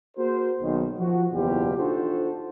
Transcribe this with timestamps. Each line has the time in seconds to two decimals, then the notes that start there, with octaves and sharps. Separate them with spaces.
0.17 A#3 F#4 G#4 A#4 C5
0.62 B1 D#3
0.99 F3 F#4
1.32 F#1 E2 B2 F4 G4
1.77 D4 D#4 F4 F#4 A4 C5